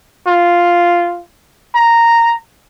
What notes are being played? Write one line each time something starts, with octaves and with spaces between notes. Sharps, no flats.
F4
A#5